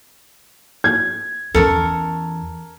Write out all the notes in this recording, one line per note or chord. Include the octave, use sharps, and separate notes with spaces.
G#6
E2 C#4 A4 A#4 C#6